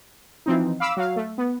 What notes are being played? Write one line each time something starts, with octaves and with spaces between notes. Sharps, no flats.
E3 F3 C4 D#4
F5 B5 D6 E6
F#3 F5
A3
B3